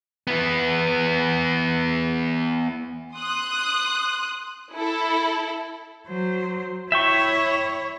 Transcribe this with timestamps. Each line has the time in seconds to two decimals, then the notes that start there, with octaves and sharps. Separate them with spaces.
0.27 E3 B3
3.14 C6 D#6 F#6
4.74 E4 A4
6.08 F#3 C5
6.92 E4 C#5 E5 G5 C#6